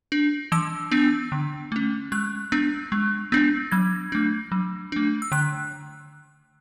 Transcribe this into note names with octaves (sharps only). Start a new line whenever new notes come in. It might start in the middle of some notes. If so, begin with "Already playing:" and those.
D4
E3 E6
B3 D4
D3
A3 C#4
G#3 F#6
B3 D4
G#3
B3 D4
F#3 G#6
A3 D4
F#3
A3 D4
E6
D3 F#6